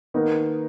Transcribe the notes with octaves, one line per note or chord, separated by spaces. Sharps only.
D#3 A#3 B3 D#4 A#4